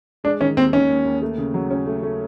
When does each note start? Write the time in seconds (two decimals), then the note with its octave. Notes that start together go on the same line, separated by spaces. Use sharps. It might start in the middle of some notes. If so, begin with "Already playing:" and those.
0.24 G#3 D4
0.40 D#3 C#4
0.57 D#2 C4
0.73 D#3 C#4
0.90 D#2
1.05 D#2
1.22 A3
1.38 C#3
1.54 F#3
1.70 C#4
1.86 A3
2.03 A3